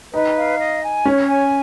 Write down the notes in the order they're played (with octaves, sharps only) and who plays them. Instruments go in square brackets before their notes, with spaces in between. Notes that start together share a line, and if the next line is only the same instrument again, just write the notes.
[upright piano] D#4 [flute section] B4
[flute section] F5
D#5
G#5
[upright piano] C#4 [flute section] C#5
[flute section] G#5